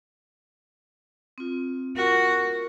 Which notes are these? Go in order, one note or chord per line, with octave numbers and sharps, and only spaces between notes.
C4 F4
F4 F#4 A#4